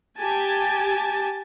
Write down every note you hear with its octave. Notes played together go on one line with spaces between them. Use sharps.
G4 G#5 A5